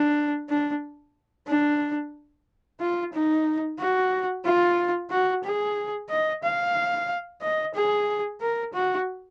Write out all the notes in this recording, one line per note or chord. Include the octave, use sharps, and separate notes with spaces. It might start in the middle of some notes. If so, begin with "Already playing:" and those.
Already playing: D4
D4
D4
F4
D#4
F#4
F4
F#4
G#4
D#5
F5
D#5
G#4
A#4
F#4